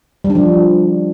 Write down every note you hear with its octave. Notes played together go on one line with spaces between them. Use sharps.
G3
D4
F3